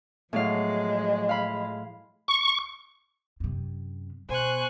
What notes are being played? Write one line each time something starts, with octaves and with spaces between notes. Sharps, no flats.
A2 F3 F#3 G#3 F5
F5 B5
C#6
F#2 C3
B2 C5 G#5 C#6 F#6